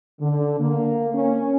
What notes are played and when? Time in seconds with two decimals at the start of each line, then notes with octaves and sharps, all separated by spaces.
0.21 D3
0.59 A#3
1.14 C#4